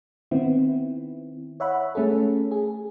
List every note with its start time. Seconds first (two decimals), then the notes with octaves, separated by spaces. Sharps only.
0.31 D#3 B3 C4 E4
1.60 C#5 E5 F#5 B5
1.95 A3 C#4 G#4 A4
2.51 G#4